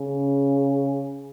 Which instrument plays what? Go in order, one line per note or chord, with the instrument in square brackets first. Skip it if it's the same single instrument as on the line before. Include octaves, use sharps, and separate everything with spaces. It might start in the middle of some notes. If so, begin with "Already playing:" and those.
Already playing: [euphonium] C#3